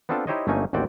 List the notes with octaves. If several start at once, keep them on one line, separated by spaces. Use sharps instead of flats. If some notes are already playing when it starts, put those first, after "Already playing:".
B3 C4 D4 F4 A4 A5
D#4 E4 G4 C5 C#5 D#5
G1 A3 A#3 C#4 D#4 G#5
A1 D#2 C4 F#4 D5 G5